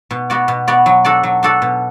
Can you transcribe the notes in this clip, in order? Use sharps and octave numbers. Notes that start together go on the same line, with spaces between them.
B2
B3 F#4 D5
B2
B3 F#4 D5
F#3
D4 F#4 A4 D5
F#3
D4 F#4 A4 D5
B2